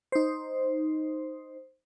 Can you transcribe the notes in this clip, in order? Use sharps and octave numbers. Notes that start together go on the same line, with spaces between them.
D#4 C5